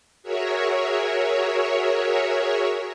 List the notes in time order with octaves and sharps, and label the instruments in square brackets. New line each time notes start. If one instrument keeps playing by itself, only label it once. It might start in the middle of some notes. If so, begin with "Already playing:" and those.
[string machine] F#4 G#4 A#4 C#5 E5